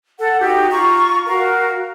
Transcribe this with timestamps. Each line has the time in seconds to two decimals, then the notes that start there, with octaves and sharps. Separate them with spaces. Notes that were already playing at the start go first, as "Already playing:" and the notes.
0.19 A4 F#5
0.40 D#4 F#4 G4
0.71 F4 A#5 C#6
1.27 F#4 A#4 F5